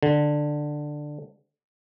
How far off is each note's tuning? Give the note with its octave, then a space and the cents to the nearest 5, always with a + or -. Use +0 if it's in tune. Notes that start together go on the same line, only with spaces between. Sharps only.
D3 +10